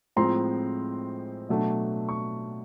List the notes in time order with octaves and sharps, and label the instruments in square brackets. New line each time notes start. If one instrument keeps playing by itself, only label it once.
[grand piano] A2 F3 G#3 C4 A#5 C6
B2 F#3 A3 D4
C#6